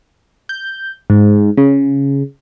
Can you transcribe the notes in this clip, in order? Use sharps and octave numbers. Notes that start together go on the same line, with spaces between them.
G6
G#2
C#3